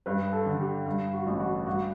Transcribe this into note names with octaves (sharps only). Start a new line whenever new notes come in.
G2 B4
A4
D3
G4
G2
F#4
A1
F#4
G2 F#4